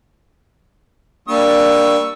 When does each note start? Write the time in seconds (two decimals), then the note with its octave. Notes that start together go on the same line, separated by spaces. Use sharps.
1.28 G3 A#3 D4 C#6 E6